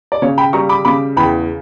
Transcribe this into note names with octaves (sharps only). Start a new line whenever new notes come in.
D5
C#3 C#5
G5 B5
G3 A#5 C#6
B5 D6
C#3 B5 D6
E2 G5 B5